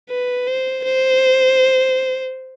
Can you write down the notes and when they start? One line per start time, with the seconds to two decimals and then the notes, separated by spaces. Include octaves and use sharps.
0.10 B4
0.47 C5
0.85 C5